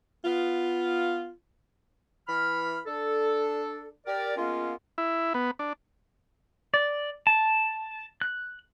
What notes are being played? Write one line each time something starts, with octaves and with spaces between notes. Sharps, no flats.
B3 F4
E3 B5 F6
D4 A4
G4 A#4 D5
G#3 A#3 B3 C#4 F4
E4
B3
D4
D5
A5
F#6